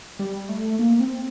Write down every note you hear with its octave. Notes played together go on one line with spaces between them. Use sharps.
G3
A3
A#3
C4